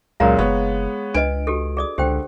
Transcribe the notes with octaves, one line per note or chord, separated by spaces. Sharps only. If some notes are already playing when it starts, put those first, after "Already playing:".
C#2 F#2 A#2 G#3 F5 A#5
F#1 G#3 B3 C#5
C#2 D4 B4 D#5 D7
F#4 G4 A4
G#4 D5 D#6
C#2 D3 G4 C5 G5